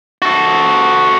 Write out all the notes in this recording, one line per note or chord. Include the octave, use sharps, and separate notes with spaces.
F#4 A4